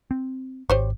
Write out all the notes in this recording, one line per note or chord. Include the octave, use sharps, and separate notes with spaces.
C4
G#1 G4 C5 C#5